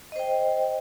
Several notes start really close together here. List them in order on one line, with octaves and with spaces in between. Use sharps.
D#5 C5 G5